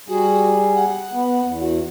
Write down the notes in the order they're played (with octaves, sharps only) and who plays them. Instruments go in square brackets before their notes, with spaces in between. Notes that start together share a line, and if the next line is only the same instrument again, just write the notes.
[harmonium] G3 G#4 [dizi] F#4
[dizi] F#5
[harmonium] B3
E2
[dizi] F#4